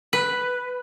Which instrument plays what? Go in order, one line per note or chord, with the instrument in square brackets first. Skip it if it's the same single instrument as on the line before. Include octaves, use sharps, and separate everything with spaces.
[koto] B4